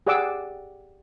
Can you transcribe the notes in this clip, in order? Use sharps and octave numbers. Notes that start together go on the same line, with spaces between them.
G4 G#4 D5 F#5 D6 E6